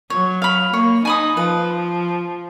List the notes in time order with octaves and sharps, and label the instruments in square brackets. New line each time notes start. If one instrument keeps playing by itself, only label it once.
[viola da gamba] F#3 [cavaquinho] C#5
[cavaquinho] F5 B5
[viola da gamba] A#3 [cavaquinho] C#5
[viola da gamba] D#4 [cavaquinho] G#5 B5 D#6
[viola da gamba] F3 [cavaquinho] B4